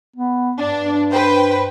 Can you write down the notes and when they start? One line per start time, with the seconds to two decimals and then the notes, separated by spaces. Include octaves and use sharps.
0.16 B3
0.57 G2 D4
1.11 B4 C5 G5